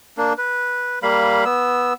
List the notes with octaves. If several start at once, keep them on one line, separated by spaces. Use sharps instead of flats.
A#3 D4
B4
G3 A#3 F5 B5
B3 E6